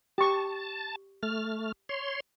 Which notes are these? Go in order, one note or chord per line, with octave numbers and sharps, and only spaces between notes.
G4 A5 C#6
A3 F6
C#5 C6